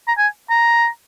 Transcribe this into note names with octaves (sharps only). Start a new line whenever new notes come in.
A#5
G#5
A#5